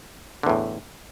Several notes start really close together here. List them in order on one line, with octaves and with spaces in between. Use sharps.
D3 E2 A2